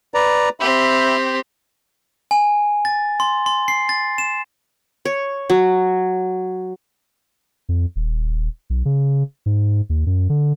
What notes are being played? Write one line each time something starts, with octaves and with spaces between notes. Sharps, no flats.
B4 D5 A#5
C4 G4 E5 B5
G#5
A6
C6
C6
C7
A6
E7
C#5
F#3
F2
D#1
B1
C#3
G#2
D#2
F#2
D3